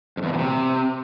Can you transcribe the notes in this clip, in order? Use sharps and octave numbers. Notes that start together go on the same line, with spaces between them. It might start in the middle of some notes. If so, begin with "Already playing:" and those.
F2
E2
B2
A#2
C3